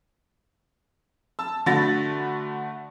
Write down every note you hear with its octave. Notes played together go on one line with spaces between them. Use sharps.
A5 E6
D3 A3 F#4 B5 A6 A#6